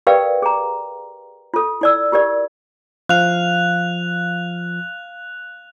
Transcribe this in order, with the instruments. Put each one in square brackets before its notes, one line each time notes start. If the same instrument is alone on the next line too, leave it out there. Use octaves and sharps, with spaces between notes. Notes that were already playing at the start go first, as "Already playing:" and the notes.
[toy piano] G4 A#4 B4 D5 F5 G5
G#4 A#5
F4 A4
E4 D5 E6
F4 G4 A#4 D5
[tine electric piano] F3 [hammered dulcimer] F5 [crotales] F#6 F7